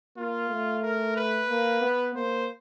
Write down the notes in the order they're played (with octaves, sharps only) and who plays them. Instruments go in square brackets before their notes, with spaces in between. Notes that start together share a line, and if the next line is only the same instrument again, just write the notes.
[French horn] A#3 [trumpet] F4
[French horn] A3
[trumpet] A#4
B4
[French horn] A#3
B3
[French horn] A#3 [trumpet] C5